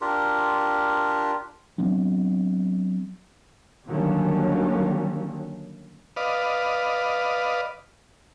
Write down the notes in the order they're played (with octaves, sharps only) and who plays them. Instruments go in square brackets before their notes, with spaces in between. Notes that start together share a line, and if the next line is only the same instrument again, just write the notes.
[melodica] D4 F4 G4 A#4
[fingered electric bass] F#3 B3 C4 D4
[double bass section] D3 D#3 F#3 G3 A#3 C#4
[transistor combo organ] B4 D5 D#5 F5